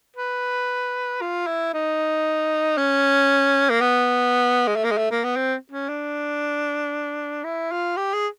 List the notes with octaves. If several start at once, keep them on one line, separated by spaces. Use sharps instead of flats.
B4
F4
E4
D#4
C#4
A#3
B3
G#3
A3
A#3
G#3
A3
A#3
B3
C4
C#4
D4
E4
F4
G4
G#4